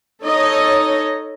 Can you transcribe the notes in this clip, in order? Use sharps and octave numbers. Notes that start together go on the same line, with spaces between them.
D#4 A4 C#5 D#5